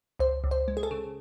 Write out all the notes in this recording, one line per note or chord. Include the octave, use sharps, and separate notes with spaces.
C#2 C5
C#2
C5
G#3
G#4
A4
C#3